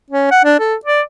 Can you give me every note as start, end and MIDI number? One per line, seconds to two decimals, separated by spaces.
0.10 0.29 61
0.31 0.42 78
0.44 0.56 62
0.59 0.75 69
0.85 1.01 74